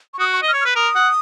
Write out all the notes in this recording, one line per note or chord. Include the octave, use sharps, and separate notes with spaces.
C#6
F#4 D#6
C#6
D#5
F6
C#5
F6
B4
A#4 D#6
F#5